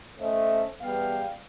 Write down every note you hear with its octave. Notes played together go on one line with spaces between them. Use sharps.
A3 C#4 C5 D#5 E5
E2 G3 B3 F5 G5